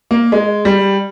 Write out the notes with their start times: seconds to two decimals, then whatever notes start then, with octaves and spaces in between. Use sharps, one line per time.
0.11 A#3
0.32 G#3
0.65 G3